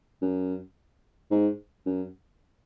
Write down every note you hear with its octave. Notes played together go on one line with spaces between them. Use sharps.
F#2
G#2
F#2